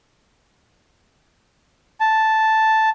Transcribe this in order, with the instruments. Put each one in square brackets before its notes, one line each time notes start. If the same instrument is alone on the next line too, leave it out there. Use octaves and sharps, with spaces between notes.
[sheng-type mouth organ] A5